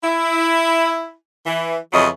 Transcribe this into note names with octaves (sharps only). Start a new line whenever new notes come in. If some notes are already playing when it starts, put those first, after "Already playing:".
E4
E3
F2 C#3 E3 F#3 D#5